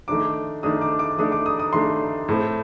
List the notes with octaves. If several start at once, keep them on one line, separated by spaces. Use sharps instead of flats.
D#3 A3 D4 D6
D#3 A3 D4 D#6
D6
D6
D#3 A3 D4 D#6
D6
D#6
D#6
D#3 A3 D4 C6
A2 A3 C4